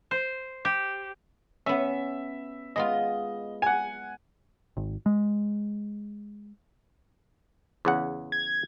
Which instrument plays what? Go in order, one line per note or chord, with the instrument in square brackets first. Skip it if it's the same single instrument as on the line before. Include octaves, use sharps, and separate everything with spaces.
[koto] C5
G4
[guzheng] B3 C#4 [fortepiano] E5
[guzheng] G#3 B3 F4 [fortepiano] D#5
[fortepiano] F#5 G#5
[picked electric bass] G#1
G#3
[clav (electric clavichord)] E2 C#3 F#5
[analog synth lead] G#6